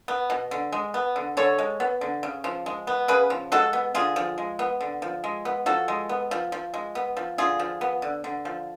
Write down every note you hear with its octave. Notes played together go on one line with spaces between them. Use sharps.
B3
B2
D3
G#3
B3
D3
D3 A4 C#5
G#3
B3
D3
C#3
F3
G#3
B3
C#3 G#4 B4
F3
G#3 F#4 A4
B3
D3 F4 G#4
F3
G#3
B3
D3
F3
G#3
B3
F3 F#4 A4
G#3
B3
F3
F3
G#3
B3
F3
D3 F4 G#4
F3
B3
D3
D3
F3